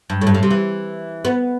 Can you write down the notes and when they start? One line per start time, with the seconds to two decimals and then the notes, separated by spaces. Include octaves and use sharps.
0.10 G2
0.21 A2
0.27 G2
0.34 A2
0.43 C3
0.51 E3
1.25 B3